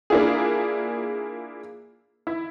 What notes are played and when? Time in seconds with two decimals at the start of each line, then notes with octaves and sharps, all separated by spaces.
0.10 A#3 D4 E4 F4 G#4
2.27 E4